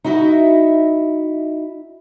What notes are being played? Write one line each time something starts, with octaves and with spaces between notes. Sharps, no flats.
D#4 E4 F#4 D#5 E5